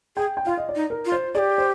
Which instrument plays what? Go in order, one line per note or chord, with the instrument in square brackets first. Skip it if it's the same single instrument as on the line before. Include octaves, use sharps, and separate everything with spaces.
[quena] G#4 [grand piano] G5
[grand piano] G5
[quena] F4 [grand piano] F5
[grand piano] D#5
D5
[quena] D#4
[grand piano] A#4
[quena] F4
[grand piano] C5
[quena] G#4 [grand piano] D5
[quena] G4
[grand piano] C5